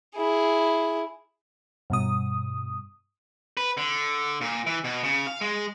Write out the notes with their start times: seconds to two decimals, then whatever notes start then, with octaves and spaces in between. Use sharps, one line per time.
0.16 E4 G#4
1.90 G2 B2 D#6
3.57 B4
3.77 D3
4.41 A#2
4.66 E3
4.84 B2
5.03 C#3
5.27 F5
5.41 G#3